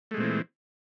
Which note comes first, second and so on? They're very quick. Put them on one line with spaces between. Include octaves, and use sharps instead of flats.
A3 G#3 A#2 C4 E3